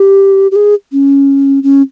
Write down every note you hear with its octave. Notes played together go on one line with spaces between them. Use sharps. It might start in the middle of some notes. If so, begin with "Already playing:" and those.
Already playing: G4
G4
G#4
C#4
C#4